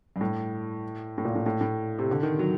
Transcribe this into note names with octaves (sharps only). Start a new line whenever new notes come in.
G2
A2
A2
A#2
A2
A2
A2
C3
D3
D#3
F#3